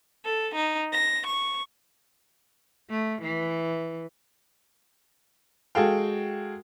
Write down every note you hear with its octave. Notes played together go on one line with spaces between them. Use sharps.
A4
D#4
A#6
C#6
A3
E3
G#3 F#4 A4 F5 G5